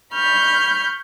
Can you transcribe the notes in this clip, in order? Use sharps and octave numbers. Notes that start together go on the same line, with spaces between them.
B5 C#6 F6 G6